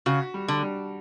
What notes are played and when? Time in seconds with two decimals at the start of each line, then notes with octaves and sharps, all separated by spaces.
0.06 C#3 F#4
0.34 G3
0.48 D3
0.62 G3